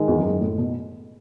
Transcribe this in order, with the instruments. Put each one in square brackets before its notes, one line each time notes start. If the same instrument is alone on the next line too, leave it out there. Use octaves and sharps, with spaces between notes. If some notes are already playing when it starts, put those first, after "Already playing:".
Already playing: [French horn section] G#2 D#3 G#3 D#4 G#4
[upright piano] E2
F#2
F#2
A2
B2